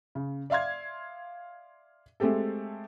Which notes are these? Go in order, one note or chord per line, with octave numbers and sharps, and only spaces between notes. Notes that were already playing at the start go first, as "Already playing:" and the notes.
C#3
D5 E5 F5 C6 G#6
G#3 A3 C4 G4 A4